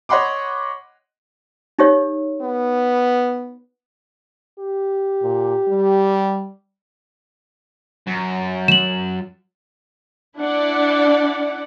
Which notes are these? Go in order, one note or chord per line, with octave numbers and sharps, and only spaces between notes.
C#5 D#5 F#5 B5 C6 D6
D#4 G4 C#5
B3
G4
A#2
G3
F#2
E7 F#7
D4 E4 D5 F#5